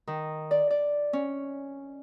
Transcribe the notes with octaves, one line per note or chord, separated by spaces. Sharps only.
D#3
D5
D5
C#4